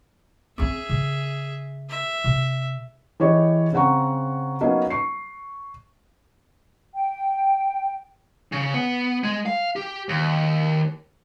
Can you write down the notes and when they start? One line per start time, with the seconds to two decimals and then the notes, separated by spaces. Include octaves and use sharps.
0.58 C4 C#4 G#4 E5
0.89 C#3
1.90 E5
2.24 C3
3.20 E3 G4 G#4 C#5 D#5
3.73 C#3 C4 F#5 A#5 C#6
4.61 F#3 A#3 B3 C#4 D#4
4.90 C#6 C7
6.93 G5
8.52 C#3
8.74 B3
9.24 G#3
9.46 F5
9.76 G4
10.09 D#2